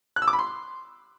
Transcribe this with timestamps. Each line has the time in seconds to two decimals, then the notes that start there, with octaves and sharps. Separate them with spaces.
0.16 F#6
0.22 E6
0.28 D6
0.33 B5
0.39 C6